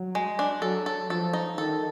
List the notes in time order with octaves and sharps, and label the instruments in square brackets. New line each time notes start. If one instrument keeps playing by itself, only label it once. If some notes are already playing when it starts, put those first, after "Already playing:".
Already playing: [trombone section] F#3
[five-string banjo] G#3
D4
[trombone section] F#3 [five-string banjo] A4
[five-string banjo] A4
[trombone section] F3 [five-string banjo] A4
[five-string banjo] D#4
[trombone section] D#3 [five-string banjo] A4